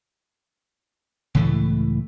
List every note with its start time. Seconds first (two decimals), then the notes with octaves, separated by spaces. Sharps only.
1.35 C#2 A2 E3 A3